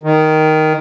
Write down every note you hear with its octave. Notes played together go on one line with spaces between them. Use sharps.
D#3